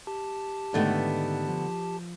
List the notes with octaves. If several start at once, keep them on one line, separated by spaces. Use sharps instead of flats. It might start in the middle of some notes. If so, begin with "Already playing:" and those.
G4 A5
G#2 D3 D#3 A3 B3 B4
F3